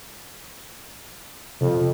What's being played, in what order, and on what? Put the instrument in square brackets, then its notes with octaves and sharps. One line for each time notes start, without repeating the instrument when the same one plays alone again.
[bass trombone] F2 [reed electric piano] C3